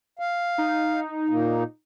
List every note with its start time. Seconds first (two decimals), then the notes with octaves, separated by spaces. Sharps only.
0.19 F5
0.58 D#4
1.29 A#2 A#3